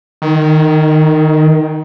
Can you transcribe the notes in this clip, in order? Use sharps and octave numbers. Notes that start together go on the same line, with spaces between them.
D#3